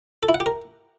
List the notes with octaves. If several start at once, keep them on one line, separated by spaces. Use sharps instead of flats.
A4
E4
F#5
G4
A#4